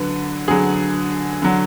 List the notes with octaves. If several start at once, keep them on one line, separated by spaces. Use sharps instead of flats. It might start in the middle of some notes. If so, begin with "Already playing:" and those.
Already playing: D3 F#3 B4
D3 F#3 G#4
D3 F#3